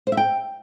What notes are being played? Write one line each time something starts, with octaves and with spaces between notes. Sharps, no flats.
C5
E5
G5